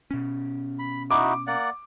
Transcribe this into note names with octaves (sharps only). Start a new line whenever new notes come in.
B2 C#4
B5
D#4 E4 F#4 D6
A#3 D5 F#5